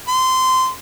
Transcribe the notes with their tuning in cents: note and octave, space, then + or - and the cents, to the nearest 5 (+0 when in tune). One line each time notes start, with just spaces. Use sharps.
C6 -20